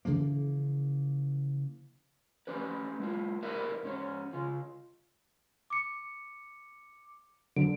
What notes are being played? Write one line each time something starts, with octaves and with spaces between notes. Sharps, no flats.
C#3 E3 F3 A#3
A3 C#4 G4 B4
G#3 E4 F4
E4 G4 A#4 B4 D#5 E5
G#2 C#4 C#5
C#3 F4
D6 C#7
D3 F#3 D7